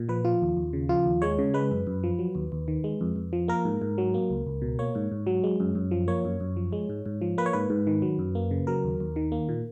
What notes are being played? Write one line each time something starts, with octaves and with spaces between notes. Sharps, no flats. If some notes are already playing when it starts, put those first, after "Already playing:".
Already playing: A#2
F3 B4
F3 F4
D#2
D#2
C#3
F3 F4
D#2
G#3 C#5
C#3
G#3 B4
F#2
F#2
F3
F#3
D#2
D#2
D#3
G#3
F2
F2
F3
A#3 A#4
G#2
G#2
F#3
A#3
C#2
C#2
B2
A#3 C#5
G#2
G#2
F#3
G#3
F#2
F#2
F3
A#3 C#5
F#2
F#2
F3
G#3
G#2
G#2
F3
A#3 B4
C#5
G#2 B4
G#2
D#3
F#3
F#2
A#3
C#3
F#3 A#4
D#2
D#2
D#3
A#3
A#2